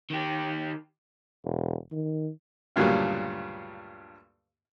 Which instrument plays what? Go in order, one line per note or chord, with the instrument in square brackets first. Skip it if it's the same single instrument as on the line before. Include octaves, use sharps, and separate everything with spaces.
[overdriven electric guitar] D#3 G4
[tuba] E1
D#3
[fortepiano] D2 G2 A#2 C#3 F#3 G3